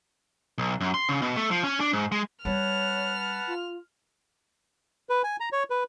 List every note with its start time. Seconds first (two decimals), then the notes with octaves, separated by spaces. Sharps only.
0.58 B1
0.81 F#2
0.94 C6
1.09 C#3
1.22 B2
1.36 A3
1.51 F3
1.64 C#4
1.80 D4
1.93 G#2
2.12 G#3
2.45 G3 C#4 B4 C#5 F#5 A5 F6
3.47 F4
5.09 B4
5.24 G#5
5.40 A#5
5.53 C#5
5.70 B4